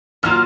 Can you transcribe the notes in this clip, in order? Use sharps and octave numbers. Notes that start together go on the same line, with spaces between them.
D#3 F#3 A#3 F4 F6